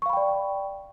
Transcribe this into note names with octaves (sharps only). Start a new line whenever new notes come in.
D5 F5 G5 B5 C#6